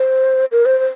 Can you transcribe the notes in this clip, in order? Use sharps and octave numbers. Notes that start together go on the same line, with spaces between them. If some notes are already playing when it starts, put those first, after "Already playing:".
Already playing: C5
A#4
C5
C5